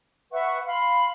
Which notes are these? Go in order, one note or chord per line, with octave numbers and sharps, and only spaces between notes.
B4 E5 F#5 C#6
F5 B5 C6